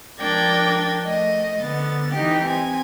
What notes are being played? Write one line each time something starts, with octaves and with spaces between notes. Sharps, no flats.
F3 D4 A#4 D5 G5 G#6
A3 D#5
D3 B3 A6
E3 D#4 G4
C4 G#5